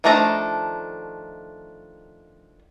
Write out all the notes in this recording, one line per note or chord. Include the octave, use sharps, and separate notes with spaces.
D#3 F3 A3 D4 A#5